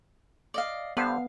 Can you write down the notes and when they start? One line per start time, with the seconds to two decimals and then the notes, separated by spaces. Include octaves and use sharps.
0.54 D5 D#5 F5
0.97 G2 D3 B3 C5 F5